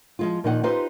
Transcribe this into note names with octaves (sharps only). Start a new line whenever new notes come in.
F3 G#3 F4
A#2 D#3 F3 D#4 A#4 F#5
D#4 F4 G4 B4 C5